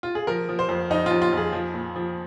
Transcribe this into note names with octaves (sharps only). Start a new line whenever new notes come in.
F4
G#4
F3 A#4
F3
C5
F2
F2 D#4
F4
F2
F4
F2 G#4
F3
A#2
F3